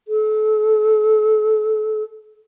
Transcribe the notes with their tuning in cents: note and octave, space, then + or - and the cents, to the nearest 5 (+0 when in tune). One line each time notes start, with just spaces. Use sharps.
A4 -35